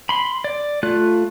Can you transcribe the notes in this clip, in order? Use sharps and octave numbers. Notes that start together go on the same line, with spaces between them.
B5 C6
D5
A3 F4 F#6